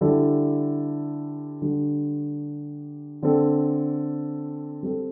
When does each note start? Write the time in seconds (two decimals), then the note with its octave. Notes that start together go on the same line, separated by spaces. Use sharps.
0.01 D3 G3 E4 A4
1.62 D3 G3 D4
3.23 D3 C4 A4
4.83 G3 C4 A4